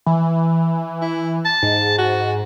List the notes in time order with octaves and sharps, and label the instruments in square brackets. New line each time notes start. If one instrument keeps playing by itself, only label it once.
[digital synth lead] E3
[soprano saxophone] E4
A5
[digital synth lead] G#2
[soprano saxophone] F#4